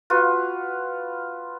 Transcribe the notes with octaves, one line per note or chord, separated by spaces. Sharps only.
F4 F#4 B4